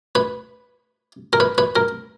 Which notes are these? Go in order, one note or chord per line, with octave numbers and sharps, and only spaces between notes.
B4
A#4
B4
B4
A#4